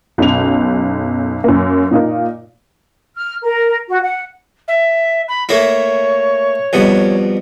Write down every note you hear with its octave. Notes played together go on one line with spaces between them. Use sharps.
B1 F#2 F7
F#2 A#3
A#2 D#4 F4 A#4
F6
A#4
F#4
F#5
E5
B5
A3 A#3 E4 C#5
F2 B2 G3